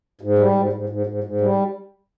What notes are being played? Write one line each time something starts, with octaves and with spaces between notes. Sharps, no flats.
G#2
G3
G#2
G#2
G#2
G#2
G#2
G3